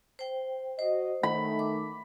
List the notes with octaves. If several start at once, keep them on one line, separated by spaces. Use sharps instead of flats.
C5 G5
F#4 C5 D#5
D#3 A3 B5
D6